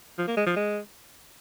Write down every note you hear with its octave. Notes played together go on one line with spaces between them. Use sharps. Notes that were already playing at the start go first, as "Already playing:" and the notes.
F3
A#3
G#3
F3
G#3